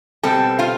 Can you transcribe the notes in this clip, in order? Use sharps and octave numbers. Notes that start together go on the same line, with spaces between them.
B2 G3 C4 A4 A5
F4 F5